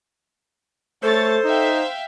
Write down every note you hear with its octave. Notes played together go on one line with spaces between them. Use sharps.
A3 A4 C5 C#5 A6
D#4 E5 F5 G5